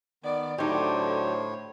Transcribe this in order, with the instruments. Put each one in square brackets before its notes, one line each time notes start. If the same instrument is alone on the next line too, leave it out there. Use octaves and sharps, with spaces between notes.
[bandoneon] D#3 B3 [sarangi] D5
[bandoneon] A2 C#5 [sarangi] D3 [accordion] F#3 C5 [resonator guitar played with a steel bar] D#4 G4